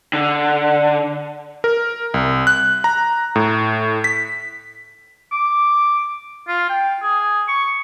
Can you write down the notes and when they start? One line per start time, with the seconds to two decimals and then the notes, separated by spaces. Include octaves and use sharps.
0.13 D3
1.64 A#4
2.14 C2
2.47 F#6
2.84 A#5
3.36 A2
4.04 B6
5.32 D6
6.48 F4
6.70 G5
7.02 G#4
7.48 C#6